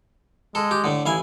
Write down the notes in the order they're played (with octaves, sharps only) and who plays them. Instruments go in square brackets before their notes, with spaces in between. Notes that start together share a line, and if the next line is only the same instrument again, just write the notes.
[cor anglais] G#3 [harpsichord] A4
[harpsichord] G4
A2 D3
[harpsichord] A1 F5 G#5 [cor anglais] E4